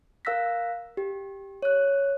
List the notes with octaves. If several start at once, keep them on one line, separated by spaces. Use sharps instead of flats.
A#4 F5 E6 F#6 A#6 B6
G4
C#5 F#6